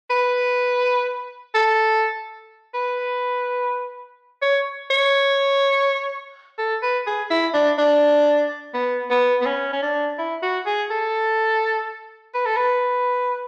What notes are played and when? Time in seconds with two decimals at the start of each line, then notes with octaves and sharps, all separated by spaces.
0.10 B4
1.55 A4
2.74 B4
4.42 C#5
4.90 C#5
6.58 A4
6.82 B4
7.07 G#4
7.31 E4
7.54 D4
7.78 D4
8.74 B3
9.10 B3
9.41 B3
9.46 C#4
9.73 C#4
9.83 D4
10.19 E4
10.42 F#4
10.66 G#4
10.91 A4
12.34 B4
12.46 A4
12.57 B4